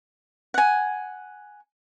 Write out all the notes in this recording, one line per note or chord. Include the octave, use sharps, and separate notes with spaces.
F#5 G#5